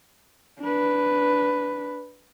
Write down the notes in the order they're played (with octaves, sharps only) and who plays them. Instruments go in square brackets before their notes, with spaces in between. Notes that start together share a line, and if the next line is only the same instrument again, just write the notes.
[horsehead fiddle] D4 B4